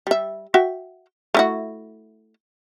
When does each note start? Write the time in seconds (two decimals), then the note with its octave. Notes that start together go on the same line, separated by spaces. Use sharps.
0.07 G3 E5
0.54 F#4 E5 G5
1.34 A3 E4 F#4